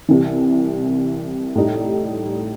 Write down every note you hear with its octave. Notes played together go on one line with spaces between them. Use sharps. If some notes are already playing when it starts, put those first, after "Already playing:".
C2 C3 E3
A2 G3 D#4